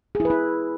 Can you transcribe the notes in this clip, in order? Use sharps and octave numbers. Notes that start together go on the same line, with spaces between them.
G#4
E4
B4
E4